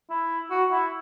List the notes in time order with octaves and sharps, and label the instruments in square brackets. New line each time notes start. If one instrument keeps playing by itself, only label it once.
[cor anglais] E4
F#4
E4